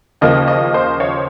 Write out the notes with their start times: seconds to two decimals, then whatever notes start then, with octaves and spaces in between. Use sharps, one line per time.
0.21 D#2 C#3 F3 A#3 D#5
0.48 D#5
0.74 C5
1.00 C#5